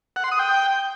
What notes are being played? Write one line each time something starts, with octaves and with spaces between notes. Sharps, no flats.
F#5
C6
D#6
G5